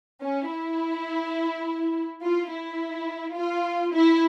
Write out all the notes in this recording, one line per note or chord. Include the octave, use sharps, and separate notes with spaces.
C#4
E4
F4
E4
F4
E4